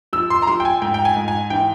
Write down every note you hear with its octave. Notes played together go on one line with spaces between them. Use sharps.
F3 E6
C6
A#5
F3 C6
G5
G#5
G#2 G5
G5
G#5
G#2
G#5
E3 G5